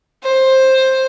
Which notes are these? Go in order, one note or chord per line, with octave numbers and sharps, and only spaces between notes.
C5